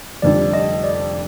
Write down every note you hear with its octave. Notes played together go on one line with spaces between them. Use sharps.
F1 F2 D3 G3 D5
D#5
D5